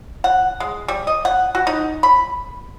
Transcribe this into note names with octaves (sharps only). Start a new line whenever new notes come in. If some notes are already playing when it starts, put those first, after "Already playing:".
F#5
G#3
G3
D#5
F#5
F#4
D#4
B5